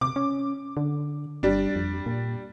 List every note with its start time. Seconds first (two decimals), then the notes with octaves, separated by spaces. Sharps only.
0.01 C3 D6
0.16 C#4
0.77 D3
1.43 G1 G3 D4
1.76 F2
2.06 A#2